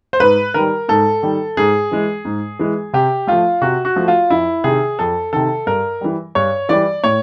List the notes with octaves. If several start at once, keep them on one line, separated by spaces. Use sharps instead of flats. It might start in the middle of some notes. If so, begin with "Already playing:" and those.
C5
G#2 B4
D#3 G3 A#4
G#2 A4
D#3 G3
G#2 G#4
E3 G#3
G#2
E3 G#3
C3 G4
F3 A3 F4
C3 F#4
F#4
F3 A3
F4
F2 E4
C3 D#3 G#4
F2 A4
C3 D#3 A4
G2 A#4
E3 G3
G2 C#5
E3 G3 D5
A2 C#5